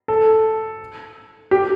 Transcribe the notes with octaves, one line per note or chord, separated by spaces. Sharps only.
A4
G4